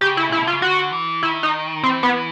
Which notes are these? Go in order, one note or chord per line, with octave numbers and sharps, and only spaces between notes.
C#3 G4
E4
A#2
E4
B2
C3 F4
C#3
D3 F#4
E3
D#3 E4
D#4
E3 C4
B3